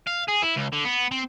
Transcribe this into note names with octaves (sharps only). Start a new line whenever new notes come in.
F5
G#4
E4
C#2
D3
B3
C4